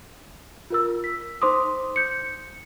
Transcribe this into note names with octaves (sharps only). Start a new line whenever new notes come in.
F4 A#4 E6
B6
D#4 C5 C6 D6 D#6
G6 C#7